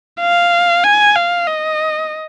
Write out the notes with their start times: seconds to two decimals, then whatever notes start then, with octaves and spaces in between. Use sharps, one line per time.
0.20 F5
0.84 G#5
1.16 F5
1.47 D#5